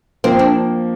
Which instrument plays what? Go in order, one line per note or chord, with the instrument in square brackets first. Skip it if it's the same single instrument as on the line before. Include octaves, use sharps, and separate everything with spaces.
[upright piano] F3 A#3 [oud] C4
[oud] D4